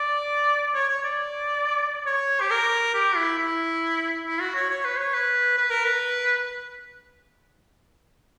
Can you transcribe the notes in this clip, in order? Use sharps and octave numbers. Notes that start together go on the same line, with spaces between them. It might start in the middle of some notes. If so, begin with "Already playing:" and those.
Already playing: D5
C#5
C#5
D5
C#5
G4
A#4
G4
E4
E4
E4
F#4
C#5
C#5
B4
C#5
B4
B4
A#4
B4